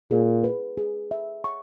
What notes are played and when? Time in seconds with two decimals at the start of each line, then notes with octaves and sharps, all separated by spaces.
0.11 A#2 G#4
0.44 B4
0.77 G#4
1.11 E5
1.44 C#6